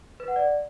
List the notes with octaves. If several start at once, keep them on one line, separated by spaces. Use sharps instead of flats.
B4
F#5
D5